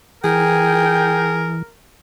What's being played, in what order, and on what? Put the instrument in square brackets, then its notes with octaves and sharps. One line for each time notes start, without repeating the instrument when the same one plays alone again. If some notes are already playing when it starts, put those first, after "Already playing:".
[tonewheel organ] E3 [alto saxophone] G#4 [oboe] A#4 [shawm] G5